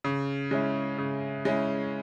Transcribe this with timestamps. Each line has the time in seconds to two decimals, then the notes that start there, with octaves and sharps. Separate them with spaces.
0.04 C#3
0.51 G#3 C#4 E4
0.98 C#3
1.45 G#3 C#4 E4